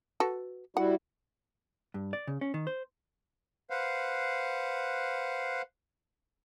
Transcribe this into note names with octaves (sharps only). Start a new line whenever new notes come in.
F#4 A4 B4
G3 E4 F#4 F#5
G2
D5
C#3
C#4
D#3
C5
B4 C5 F5 F#5